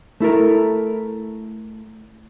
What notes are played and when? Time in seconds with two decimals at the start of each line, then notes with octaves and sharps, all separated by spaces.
0.20 A3 E4 A4 A#4